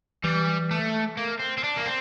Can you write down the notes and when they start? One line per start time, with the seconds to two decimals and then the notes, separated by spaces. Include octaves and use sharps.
0.24 E3 G3
0.71 A3
1.17 A#3
1.39 C4
1.58 C4
1.64 D4
1.77 A#3
1.86 C4